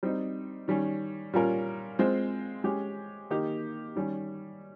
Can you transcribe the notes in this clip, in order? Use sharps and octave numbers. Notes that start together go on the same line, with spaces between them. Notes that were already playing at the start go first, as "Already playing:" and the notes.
G3 C4 D#4
D#3 G3 C#4
A#2 G3 C#4 F4 A#4
G#3 C4 F4 C5
G#3 C#4 G4
D#3 A#3 D#4 G4
D#3 G3 C#4